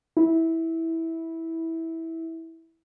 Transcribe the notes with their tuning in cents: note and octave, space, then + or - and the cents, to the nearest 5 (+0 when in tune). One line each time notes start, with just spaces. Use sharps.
E4 -15